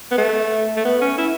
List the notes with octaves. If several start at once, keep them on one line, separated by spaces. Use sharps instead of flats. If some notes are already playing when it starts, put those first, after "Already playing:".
B3
A3
A3
B3
C#4
E4